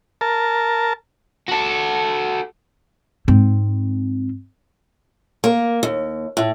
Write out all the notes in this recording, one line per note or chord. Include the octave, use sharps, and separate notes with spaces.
A#4 A5
F#4 A4
G#2 C4
A#3
D#2
A2